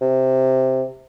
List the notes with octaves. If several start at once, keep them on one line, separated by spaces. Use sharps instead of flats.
C3